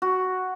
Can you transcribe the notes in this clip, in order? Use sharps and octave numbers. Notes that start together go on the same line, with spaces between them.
F#4